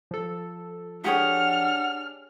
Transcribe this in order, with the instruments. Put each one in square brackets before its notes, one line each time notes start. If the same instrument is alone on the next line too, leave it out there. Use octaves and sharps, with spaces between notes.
[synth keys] F3 A4
[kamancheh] D4 F6 [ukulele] G4 G#4 C#5 [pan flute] F#5